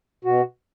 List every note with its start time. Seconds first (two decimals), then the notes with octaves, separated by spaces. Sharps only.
0.25 B2 F#4